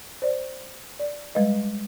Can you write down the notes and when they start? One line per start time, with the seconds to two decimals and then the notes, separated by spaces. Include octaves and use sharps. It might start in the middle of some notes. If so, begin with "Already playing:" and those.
0.22 C5 D5
0.99 D5
1.35 G3 G#3 B4 D#5